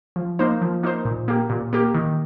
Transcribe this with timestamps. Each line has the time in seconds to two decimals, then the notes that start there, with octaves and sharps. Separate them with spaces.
0.16 F3
0.39 A#3 D#4 C5
0.62 F3
0.83 A#3 D#4 C5
1.05 A#2
1.28 A#3 G4
1.50 A#2
1.73 A#3 G4
1.94 D#3